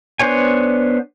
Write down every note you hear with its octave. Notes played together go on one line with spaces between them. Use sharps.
B3 D4 C5 C#5 G#5